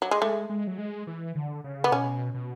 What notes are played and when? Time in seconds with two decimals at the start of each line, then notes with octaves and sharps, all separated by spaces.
0.02 F#3
0.11 G#3
0.22 G#3 A3
0.49 G#3
0.67 F#3
0.78 G#3
1.07 E3
1.35 D3
1.64 C#3
1.84 B3
1.92 B2 C#4
2.34 B2